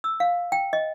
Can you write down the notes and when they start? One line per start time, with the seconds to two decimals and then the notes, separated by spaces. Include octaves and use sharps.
0.04 E6
0.20 F5
0.52 G5
0.73 D#5